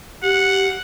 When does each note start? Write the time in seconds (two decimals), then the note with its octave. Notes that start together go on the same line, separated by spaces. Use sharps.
0.23 G4 F#5